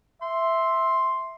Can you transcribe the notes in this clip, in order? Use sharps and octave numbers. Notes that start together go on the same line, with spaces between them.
E5 C6